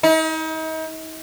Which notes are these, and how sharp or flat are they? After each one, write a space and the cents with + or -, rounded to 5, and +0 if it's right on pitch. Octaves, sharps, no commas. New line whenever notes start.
D#4 +40